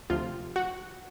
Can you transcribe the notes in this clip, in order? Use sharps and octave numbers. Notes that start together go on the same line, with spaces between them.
D2 C3 F3 F4
F#4